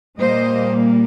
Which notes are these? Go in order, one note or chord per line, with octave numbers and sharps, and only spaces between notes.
A#2 G3 A#3 C5 D#5